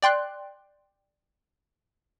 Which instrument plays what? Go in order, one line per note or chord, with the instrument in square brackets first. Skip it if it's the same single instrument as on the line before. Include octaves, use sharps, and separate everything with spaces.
[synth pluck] D5 G5 C6 F#6